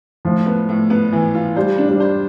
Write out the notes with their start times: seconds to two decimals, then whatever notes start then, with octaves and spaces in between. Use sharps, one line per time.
0.25 A2 F3
0.46 B3
0.69 A2
0.90 B3
1.13 E3
1.35 F4
1.56 G3 C5
1.78 D4
1.89 G3
2.00 C5